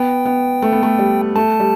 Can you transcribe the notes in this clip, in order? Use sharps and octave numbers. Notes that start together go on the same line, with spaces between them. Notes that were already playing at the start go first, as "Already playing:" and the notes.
Already playing: B3 G5
B3
A3
B3
A3
G3
A3 A5
G3